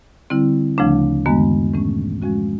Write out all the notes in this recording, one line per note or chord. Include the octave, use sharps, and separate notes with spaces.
D3 G3 C4 E4
D2 C#3 F3 A3 D4
F#2 D#3 G#3 B3
A2 E3 A3 C#4
F3 G#3 C#4 F#4